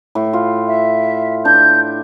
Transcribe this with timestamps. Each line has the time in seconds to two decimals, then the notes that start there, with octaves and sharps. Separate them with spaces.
0.15 A2
0.33 F4
0.68 E5
1.45 D4 G6